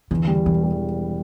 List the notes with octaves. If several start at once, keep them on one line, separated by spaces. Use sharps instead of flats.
E2 D3
G3
E1 E3
G3